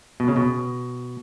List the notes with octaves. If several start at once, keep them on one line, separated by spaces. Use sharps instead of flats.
B2
C#3
B2